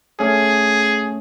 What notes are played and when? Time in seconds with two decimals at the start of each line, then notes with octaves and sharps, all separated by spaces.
0.19 A3 C#4 G#4